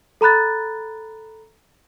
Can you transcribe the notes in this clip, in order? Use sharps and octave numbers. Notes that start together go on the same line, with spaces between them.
A4 A#5 B5 F#6 A6